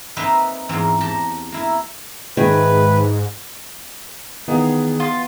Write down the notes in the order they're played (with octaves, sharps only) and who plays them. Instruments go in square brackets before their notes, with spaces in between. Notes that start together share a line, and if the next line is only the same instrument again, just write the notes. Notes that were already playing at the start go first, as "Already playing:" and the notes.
[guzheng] A#3 C4 D#4 B4 E5 G5
E2 G#2 A#3 C4
G4 A5 A#5
A#3 E4
[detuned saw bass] G#2 [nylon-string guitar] D#3 G#4 E5 [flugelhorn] B4
[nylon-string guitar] D#3 G#4 F5 [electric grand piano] E3 B3
[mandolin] F4